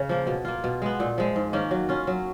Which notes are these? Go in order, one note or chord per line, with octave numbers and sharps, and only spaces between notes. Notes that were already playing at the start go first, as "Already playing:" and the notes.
Already playing: C#3
F3 A#3
B2
A#3 F4
B2
G#3 B3
A#2
F3 G#3
G#2
D#3 A#3 C#4
F#3
C#4 F4
F#3